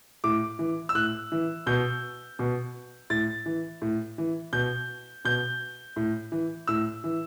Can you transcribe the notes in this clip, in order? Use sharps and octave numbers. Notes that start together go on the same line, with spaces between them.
A2 D6
E3
E6
A2 F#6
E3
B2 G6
B2
A2 A6
E3
A2
E3
B2 G6
B2 G6
A2
E3
A2 E6
E3